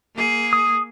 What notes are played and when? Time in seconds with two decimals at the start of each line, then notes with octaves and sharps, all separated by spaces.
0.15 A#3 G#4
0.53 D#6